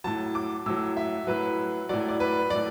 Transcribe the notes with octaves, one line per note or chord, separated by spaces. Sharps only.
A2 F#3 A5
D6
A2 F#3 E6
E5
A2 F#3 B4
A2 F#3 D5
D5
B4
A2 F#3 D5